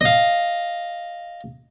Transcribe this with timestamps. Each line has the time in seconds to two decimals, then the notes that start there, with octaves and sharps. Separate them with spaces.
0.01 D#5 F5